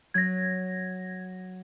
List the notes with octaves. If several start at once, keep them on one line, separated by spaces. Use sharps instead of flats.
F#3 G#6 A#6